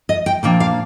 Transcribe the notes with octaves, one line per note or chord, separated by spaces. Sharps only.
D#5
G5
A#2 F3 A#3 D4 G5
F5